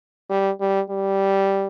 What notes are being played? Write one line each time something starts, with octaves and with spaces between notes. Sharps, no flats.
G3
G3
G3